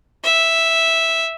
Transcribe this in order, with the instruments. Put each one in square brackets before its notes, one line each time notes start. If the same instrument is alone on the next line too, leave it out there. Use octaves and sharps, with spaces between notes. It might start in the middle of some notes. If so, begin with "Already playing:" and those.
[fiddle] E5